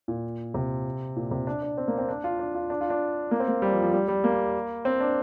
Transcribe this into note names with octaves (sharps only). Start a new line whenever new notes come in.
A#2
C3
A#2
C3
D4
D4
C4
A#3
C4
D4
F4
D4
F4
D4
F4
D4
A#3
C4
A#3
G3
F3
F3
G3
G3
A#3
C4
D4